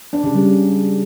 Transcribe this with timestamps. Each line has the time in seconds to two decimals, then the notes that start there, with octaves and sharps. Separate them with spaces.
0.13 D4
0.24 C#3
0.35 G3